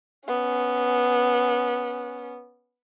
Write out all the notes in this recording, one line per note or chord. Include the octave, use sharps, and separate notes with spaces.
B3 C#4